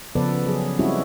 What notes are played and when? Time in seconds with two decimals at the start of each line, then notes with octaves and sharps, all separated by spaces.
0.15 C#3 F3 B3 A4 B4 D5
0.46 F#3 G#4
0.79 G3 G#3 C4 C#4 E4 F#4